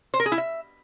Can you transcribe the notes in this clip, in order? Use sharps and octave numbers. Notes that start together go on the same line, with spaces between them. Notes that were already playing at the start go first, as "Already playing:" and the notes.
C5
A#4
G#4
E4
E5